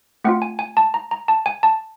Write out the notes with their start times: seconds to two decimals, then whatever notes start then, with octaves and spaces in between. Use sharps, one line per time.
0.24 A3 C4 F4 F#5
0.42 G#5
0.59 G#5
0.77 A5
0.94 A#5
1.11 A#5
1.28 A5
1.46 G#5
1.63 A5